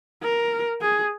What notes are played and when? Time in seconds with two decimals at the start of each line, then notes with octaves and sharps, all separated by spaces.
0.23 A#4
0.82 G#4